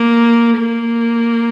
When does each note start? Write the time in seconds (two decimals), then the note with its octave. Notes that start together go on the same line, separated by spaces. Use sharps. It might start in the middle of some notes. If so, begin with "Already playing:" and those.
Already playing: A#3
0.58 A#3